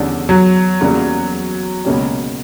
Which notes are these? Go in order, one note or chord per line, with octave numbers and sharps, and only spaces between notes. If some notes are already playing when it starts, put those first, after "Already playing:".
Already playing: E2 D3 G3 C#4
F#3
E2 C#3 G3 A#3
C#2 B2 A#3 C#4 G4